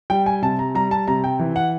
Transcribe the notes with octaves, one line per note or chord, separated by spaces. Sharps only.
G3 G5
G#5
C3 A5
A#5
G3 A#5
A5
C3 A#5
G5
E3
F#5